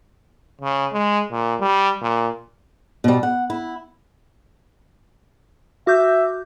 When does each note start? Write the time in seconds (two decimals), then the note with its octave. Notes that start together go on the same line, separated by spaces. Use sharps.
0.62 C#3
0.93 G#3
1.32 A#2
1.61 G3
2.02 A#2
3.04 B2 G3
3.23 F#5
3.50 E4
5.87 F#4 E5 D6 G6